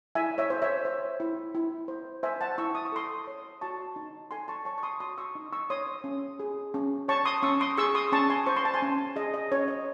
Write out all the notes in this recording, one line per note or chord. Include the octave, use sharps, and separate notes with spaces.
E4 E5 G#5
C#5 E5
C5
C#5 E5
C5
E4
E4
C5
C5 E5 G#5
F#5 A5
E4 C#6 E6
D#6
C#6
A4 C6 D#6
C#5
F#4 A5 C#6
D#4
A4 G#5 C6
A5 C#6
C#5 A5 C#6
C#6
C6 D#6
F#4 C6 D#6
C#6 E6
D#4
C#6 E6
C#5 C6 D#6
C#4
G#4
C#4
C#5 A5 C#6
C6 D#6
C#4 C#6 E6
C6 D#6
G#4 C#6 E6
C6 D#6
C#4 A5 C#6
G#5 C6
C5 C#6
C6
A5
G#5 C6
C#4
G#4 D#5
D#5
C#4 C#5
D#5